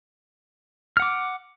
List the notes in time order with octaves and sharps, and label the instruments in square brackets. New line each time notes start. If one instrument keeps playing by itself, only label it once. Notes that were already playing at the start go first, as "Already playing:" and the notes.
[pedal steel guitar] F6
F#5
D6